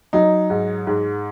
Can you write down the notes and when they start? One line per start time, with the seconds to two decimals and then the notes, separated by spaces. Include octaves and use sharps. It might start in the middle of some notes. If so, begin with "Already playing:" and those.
0.13 F#3 D#4
0.50 G#2
0.87 G#2